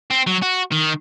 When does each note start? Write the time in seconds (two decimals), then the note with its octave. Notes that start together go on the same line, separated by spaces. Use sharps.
0.11 C4
0.27 F#3
0.42 F#4
0.72 D#3